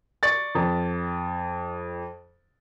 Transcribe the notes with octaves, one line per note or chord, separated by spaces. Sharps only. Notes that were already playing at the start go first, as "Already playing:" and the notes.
D5 C#6 A6
F2